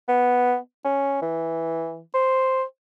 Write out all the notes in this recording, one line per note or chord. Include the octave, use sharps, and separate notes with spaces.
B3
C#4
E3
C5